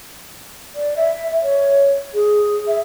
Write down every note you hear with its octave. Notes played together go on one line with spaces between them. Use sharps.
D5
E5
C#5
G#4
E5